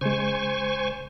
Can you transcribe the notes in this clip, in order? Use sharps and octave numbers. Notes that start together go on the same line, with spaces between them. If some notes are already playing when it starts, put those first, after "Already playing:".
C#3 G#3 C5 G#5 C#6